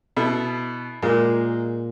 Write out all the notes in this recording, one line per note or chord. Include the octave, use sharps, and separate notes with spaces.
B2 E4 A4
A#2 G#3 A#3